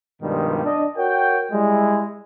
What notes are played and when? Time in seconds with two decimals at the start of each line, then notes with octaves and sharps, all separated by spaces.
0.22 G2 B2 D#3 F3 G3 G#3
0.65 D4 D#5
0.97 F#4 A#4 C#5 F#5 G5
1.52 G3 G#3 E4